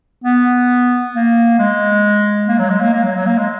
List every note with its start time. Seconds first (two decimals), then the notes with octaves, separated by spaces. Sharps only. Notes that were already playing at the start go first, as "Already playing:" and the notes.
0.24 B3
1.14 A#3
1.59 G#3
2.48 A#3
2.59 F#3
2.70 G#3
2.81 A#3
2.93 A#3
3.03 F#3
3.16 F#3
3.26 A#3
3.38 G#3